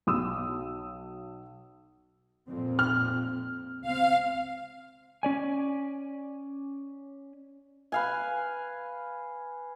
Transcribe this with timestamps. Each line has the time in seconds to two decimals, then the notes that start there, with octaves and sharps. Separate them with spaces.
0.07 B1 D#6 E6
2.48 F2 A#2 C4
2.79 F6
3.81 C#2 C4 F5
5.23 C#4 D5 G#5
7.92 B4 F5 G#5